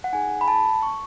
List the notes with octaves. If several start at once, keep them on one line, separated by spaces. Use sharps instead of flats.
F#5
D#4 G#4 G#5
B5
A5
C#6